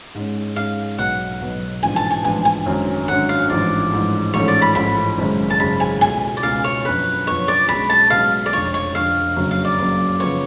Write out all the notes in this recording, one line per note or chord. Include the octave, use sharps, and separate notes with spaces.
G#2 G#3 C#4
G#2 G#3 C#4 F5
B1 B2 F#3 B3 F#5
B1 B2 F#3 B3
A1 G#2 F3 B3 D4 G#5
A5
G#5
A1 G#2 F3 B3 D4 G#5
G#5
G#1 F#2 D3 F#3 C#4
G#1 F#2 D3 F#3 C#4 F#5
F5
A1 G#2 F3 D5
A1 G#2 F3
A1 G#2 F3 A3 C#4 C#5
D5
B5
A1 G#2 F3 A3 C#4 B5
G#1 F#2 C#3 G#3
A5
G#1 F#2 C#3 G#3 B5
G#5
C#2 B2 A3 G#5
D5
C#2 B2 A3 F5
C#5
F#2 F3 B3 D4 B4
F#2 F3 B3 D4 C#5
D5
B1 B2 G#3 C#4 B5
A5
B1 B2 G#3 C#4 F5
D5
F1 F2 D3 C#5
C#5
F1 F2 D3 F5
F#1 F#2 C#3 F#3
F5
D5
F#1 F#2 C#3 F#3
C#3 F3 B3 C#5